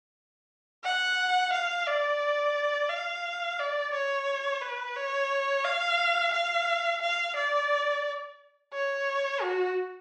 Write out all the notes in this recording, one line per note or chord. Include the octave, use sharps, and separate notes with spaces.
F#5
F5
D5
F5
D5
C#5
B4
C#5
F5
F5
F5
D5
C#5
F#4